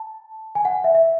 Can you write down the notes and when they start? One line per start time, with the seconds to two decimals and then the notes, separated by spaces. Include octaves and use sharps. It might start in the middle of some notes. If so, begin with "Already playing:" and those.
Already playing: A5
0.55 G#5
0.65 F#5
0.84 E5
0.95 E5